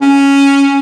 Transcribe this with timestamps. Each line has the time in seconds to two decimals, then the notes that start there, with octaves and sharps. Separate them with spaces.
0.01 C#4